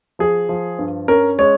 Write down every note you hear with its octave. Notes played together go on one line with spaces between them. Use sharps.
F3 G#4
F3
G2
C#4 A#4
G#3 C#5